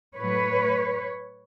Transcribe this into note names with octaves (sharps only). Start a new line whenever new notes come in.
A2 F#3 A3 B4 C#5